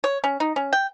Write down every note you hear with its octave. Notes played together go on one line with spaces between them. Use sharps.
C#5
C#4
D#4
C#4
G5